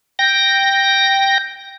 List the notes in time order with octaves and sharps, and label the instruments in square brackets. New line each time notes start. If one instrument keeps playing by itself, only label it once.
[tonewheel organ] G5 A#6